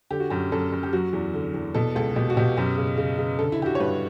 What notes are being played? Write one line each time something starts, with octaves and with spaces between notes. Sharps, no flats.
D3 G4
F#4
F#2 G4
F#2 A4
F#2
G4
F#3 F#4
E2
D3
E2
B2 A4
C#2 A4
B2 G4
F#4
B2 G4
F#2 G4
C#3
C#3
C#3
D3 A4
E4
D3 G4
F#4
C#5
G2 B4